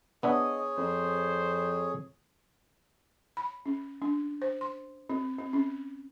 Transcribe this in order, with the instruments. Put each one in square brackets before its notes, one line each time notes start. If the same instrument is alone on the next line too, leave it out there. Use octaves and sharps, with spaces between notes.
[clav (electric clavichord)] B3 D4 E5 [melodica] G#4 C#5 [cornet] D#5
[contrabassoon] F2 [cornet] C5
[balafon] B5
C#4
D4
C5
C6
C4
C4
C#4